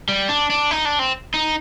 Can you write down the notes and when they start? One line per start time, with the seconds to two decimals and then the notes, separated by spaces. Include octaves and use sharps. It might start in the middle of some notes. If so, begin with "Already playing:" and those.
0.09 G3
0.29 D4
0.50 D4
0.71 D#4
0.85 D4
0.99 C4
1.34 D#4